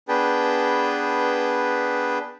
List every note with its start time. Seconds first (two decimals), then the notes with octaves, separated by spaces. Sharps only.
0.08 B3 D4 G#4 B4 G5 A5